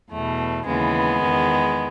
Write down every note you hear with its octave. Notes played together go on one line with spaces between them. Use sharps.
E2 B2 A3
D#2 C#3 E3 G#3 B3
E2 D#3